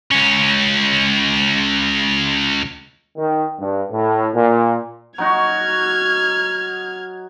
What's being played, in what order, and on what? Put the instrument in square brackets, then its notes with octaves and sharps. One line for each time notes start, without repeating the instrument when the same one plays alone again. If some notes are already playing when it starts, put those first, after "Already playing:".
[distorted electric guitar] C#2 C#4
[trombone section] D#3
G2
A2
A#2
[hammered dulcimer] F#3 D#4 F#4 [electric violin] F6 G#6